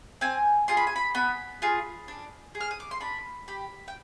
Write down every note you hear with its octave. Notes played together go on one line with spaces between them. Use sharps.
C4 G#5
F4 G#4 C6
B5
G#5
B5
B3 B5
F4 G#4
D4
G#4
F6
D#6
D6
C6
D4 B5
G4 B5
G5